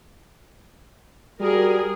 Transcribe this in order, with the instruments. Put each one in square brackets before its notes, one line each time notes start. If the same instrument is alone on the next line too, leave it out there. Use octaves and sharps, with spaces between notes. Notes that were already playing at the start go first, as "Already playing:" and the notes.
[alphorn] G3 [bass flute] F#4 [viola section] G#4 A#4